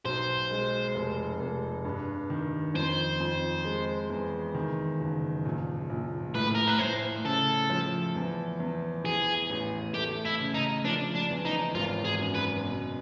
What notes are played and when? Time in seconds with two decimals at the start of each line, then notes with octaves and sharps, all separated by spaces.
0.05 B1 C5
0.51 G#3
0.95 F1
1.40 F1
1.85 G2
2.30 D#3
2.74 F2 C5
3.20 F2
3.65 G#3
4.10 E2
4.54 D#3
5.00 F#1
5.45 A#1
5.90 A#1
6.35 A2 B4
6.55 A#4
6.68 B4
6.79 A2 C5
7.24 C#3 A4
7.70 F3
8.15 E2
8.60 E2
9.04 E3 G#4
9.50 A1
9.94 A3 G4
10.25 E4
10.40 C#3
10.54 D#4
10.84 F3 D4
11.15 D4
11.30 E2
11.45 D#4
11.75 G#1 F4
12.05 G#4
12.19 F#2
12.35 B4
12.65 B2